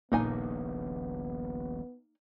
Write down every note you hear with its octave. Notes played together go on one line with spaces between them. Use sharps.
D#1 A#1 A#2 C#3 A#3 B3 D#4 G#5